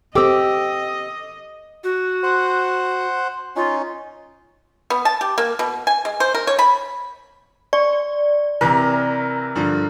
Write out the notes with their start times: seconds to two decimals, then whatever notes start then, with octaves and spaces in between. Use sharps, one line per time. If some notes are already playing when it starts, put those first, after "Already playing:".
0.15 C4 G4 A4 D#5 D6 E6
1.84 F#4
2.23 C5 F#5
3.56 C#4 D#4 F4
4.90 B3
5.05 A5
5.21 G4
5.38 A#3
5.59 B2
5.87 G#5
6.05 G#3
6.20 C5
6.34 A#4
6.47 C#5
6.59 B5
7.73 D5 C#6
8.61 C3 E3 A#4 A#5
9.55 G2 D3 F3